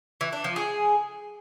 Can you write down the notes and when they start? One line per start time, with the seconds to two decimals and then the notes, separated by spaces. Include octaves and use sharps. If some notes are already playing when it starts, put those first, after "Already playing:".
0.21 E3
0.33 D4
0.44 F3
0.56 G#4